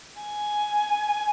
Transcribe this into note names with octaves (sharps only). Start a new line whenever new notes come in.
G#5